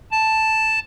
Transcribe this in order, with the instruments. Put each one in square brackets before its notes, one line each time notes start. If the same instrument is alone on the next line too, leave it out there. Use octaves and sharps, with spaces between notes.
[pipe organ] A5